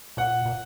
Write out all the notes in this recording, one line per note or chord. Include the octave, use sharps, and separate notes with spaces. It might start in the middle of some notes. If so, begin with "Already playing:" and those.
A#2 F#5
A#2